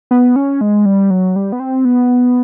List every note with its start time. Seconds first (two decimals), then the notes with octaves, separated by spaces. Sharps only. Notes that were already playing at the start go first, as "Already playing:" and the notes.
0.11 B3
0.36 C#4
0.61 G#3
0.86 G3
1.11 F#3
1.36 G3
1.52 B3
1.60 C4
1.85 B3